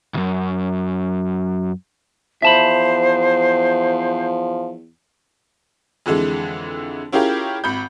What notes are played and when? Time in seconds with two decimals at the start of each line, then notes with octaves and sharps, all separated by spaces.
0.14 C#2 F#2
2.42 E2 F3 C5 E5 A5 B5
6.06 F2 D3 E3 G#3
7.12 C#4 E4 F4 G4 G#4 A#4
7.64 G#1 B5 G6